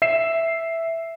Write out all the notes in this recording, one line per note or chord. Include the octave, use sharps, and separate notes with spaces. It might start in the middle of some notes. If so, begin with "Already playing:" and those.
E5 C7 E7